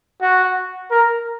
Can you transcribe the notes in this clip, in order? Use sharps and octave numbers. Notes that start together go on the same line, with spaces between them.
F#4
A#4